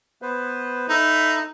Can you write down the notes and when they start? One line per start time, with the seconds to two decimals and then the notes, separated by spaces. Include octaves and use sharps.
0.22 B3 B4 C5
0.89 D#4 A4 E5 B5